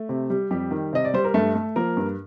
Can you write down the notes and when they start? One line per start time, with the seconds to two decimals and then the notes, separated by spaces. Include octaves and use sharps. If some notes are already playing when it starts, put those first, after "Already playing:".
Already playing: A3 A4
0.09 C3
0.30 G3
0.51 F2 G3 G4
0.71 D#3
0.93 C3 D#5
1.05 D5
1.14 G3 C5
1.24 A#4
1.34 G2 A3 A4
1.55 A3
1.76 F3 A#3 A#4
1.97 G2